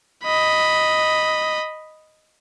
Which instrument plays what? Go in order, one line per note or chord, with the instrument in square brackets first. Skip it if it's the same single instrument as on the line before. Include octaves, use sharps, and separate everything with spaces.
[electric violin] D#5 B5